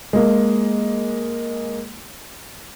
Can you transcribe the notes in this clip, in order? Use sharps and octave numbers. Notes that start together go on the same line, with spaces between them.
G#3 A#3